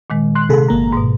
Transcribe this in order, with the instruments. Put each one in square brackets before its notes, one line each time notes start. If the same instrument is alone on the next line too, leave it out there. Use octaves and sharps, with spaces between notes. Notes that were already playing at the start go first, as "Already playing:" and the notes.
[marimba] A#2 D#3 G#3
[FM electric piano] C6 F#6
C3 G#4 A4
G1 A#3 A#5
[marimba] G#2 B2